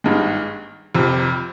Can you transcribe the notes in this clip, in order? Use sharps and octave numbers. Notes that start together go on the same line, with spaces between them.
G#1 G2 D#3 G#3
F1 F2 C3